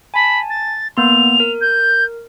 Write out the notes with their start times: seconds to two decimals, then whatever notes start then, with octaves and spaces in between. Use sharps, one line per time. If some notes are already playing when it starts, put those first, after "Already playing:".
0.14 G#5 A5 B5
0.49 A6
0.97 A#3 B3 C6 F7
1.40 A#4
1.61 G6